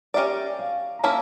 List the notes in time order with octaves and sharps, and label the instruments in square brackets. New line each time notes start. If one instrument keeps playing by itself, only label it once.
[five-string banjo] C#4 G4 A#4 D5 [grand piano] E5
[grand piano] F5
A#5
[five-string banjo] A#3 C#4 E4 [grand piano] A5